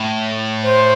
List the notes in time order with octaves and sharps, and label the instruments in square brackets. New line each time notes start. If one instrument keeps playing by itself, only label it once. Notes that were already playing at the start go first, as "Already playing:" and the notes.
Already playing: [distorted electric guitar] A2
[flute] C5